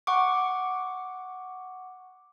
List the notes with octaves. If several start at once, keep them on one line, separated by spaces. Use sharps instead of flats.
F#5 C#6 D6